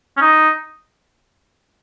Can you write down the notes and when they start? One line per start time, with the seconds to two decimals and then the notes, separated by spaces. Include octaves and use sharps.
0.17 C#4
0.21 D#4